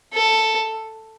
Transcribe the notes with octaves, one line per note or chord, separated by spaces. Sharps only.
A4